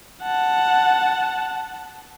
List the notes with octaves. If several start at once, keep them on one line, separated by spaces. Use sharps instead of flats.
F#5 A5